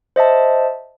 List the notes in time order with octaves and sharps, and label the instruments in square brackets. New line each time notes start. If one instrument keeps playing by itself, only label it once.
[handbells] C5 D#5 E5 A5